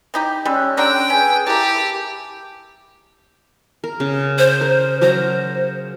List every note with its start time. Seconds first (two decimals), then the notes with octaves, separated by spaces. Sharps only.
0.14 E3 D#4 G4
0.45 G3 G#3 C#4 E6 F#6
0.77 D3 D4 G5 A#5
1.10 C#4 G#4 B4 G#5
1.47 E4 G4 A#4 A5
3.84 A#4
4.00 C#3
4.39 C5
4.61 A#4
5.02 F#3 A#4 C5 A#5